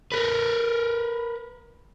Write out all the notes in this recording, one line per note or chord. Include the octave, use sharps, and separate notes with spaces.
A#4 B4